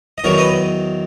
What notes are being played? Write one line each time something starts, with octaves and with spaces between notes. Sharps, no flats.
D#5
E2 D#3 F#3 A#4 C#5
B4 D#5